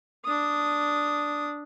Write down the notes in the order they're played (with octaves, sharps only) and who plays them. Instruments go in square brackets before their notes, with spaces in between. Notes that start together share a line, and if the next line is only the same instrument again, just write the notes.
[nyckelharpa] D4 D#6